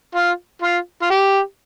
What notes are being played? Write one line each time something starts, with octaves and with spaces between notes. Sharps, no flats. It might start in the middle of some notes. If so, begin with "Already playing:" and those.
F4
F4
F4
G4